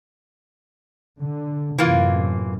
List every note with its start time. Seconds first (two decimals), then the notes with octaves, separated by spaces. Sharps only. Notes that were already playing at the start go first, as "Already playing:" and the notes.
1.20 D3
1.78 F#2 A2 C3 E3 A#3 F4